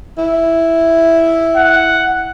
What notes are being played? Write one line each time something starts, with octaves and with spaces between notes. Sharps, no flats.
E4
F#5